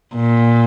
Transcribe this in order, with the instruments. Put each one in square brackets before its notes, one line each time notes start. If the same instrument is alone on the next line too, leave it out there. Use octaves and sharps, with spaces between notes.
[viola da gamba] A#2